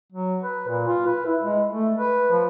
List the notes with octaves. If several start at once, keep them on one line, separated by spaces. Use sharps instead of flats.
F#3
B4
A#2
F4
B4
E4
G#3
A3
B4
F3